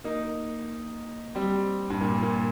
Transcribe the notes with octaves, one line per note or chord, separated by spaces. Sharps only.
A#3 D#4
G3 C4
G2
A#2
A#2